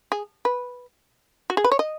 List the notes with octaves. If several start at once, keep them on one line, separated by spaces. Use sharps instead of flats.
G#4
B4
F#4
G#4
B4
C#5
D#5